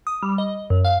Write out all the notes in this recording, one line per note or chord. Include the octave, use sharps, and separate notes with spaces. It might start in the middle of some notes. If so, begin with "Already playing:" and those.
D#6
G3
D#5
F#2
F5